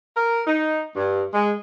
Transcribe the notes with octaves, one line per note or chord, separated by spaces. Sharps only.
A#4
D#4
G2
G#3